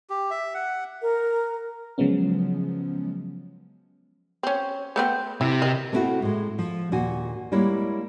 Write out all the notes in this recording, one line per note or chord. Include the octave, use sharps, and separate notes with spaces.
G4
E5
F#5
A#4
C#3 F3 F#3 G#3 B3 C#4
C4 C#4
A3 B3 C4
C3 E4 G4
A#4 D#5
A3 C4 D4 E4 F#4
A2 G#3
F3
D#2 A#2 F#4 G#5
G3 G#3 A#3 E4 C#5